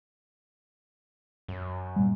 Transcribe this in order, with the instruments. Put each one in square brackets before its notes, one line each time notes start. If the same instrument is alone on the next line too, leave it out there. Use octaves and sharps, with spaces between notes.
[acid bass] F#2
[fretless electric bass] A#2 G3